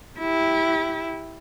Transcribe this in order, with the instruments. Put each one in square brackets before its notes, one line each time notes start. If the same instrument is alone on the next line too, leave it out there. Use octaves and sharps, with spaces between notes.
[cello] E4 G4